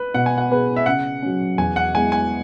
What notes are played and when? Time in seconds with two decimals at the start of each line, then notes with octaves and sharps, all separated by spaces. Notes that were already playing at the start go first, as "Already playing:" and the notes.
Already playing: B4
0.14 B2 F#5
0.26 G#5
0.38 F#5
0.50 B3 G#4 B4
0.76 E5
0.86 C#3 F#5
1.23 F#3 C#4
1.58 E2 G#5
1.76 F#5
1.94 E3 G#3 B3 G#5
2.12 G#5